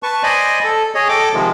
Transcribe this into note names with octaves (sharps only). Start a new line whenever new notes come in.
B4 A5 C#6
C5 D5 D#5 G#5 B5
A4
G#4 C#5 D#5
A4 G5 D6
C3 D#3 F3 G#3